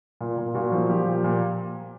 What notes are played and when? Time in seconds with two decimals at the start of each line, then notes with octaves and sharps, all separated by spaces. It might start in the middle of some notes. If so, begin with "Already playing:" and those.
0.21 A#2 F4
0.38 A#2
0.55 A#2 F#4
0.72 F3
0.89 F3 G4
1.07 A#2
1.24 A#2